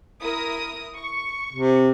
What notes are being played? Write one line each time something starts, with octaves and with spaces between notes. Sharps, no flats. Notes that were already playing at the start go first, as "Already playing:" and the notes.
E4 A#4 D#6
C#6
C3